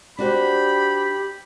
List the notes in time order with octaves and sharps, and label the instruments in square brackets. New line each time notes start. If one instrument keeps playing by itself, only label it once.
[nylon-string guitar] D4 F#4 C5 [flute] G4 [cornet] B5